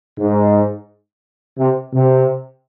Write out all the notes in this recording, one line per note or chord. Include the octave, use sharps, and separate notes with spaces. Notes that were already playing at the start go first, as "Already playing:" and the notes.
G#2
C3
C3